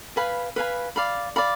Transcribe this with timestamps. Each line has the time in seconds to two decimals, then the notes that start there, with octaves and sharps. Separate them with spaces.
0.16 B4 F5 G#5 B5
0.56 B4 F5 G#5 B5
0.96 D5 F5 B5
1.36 D5 F5 B5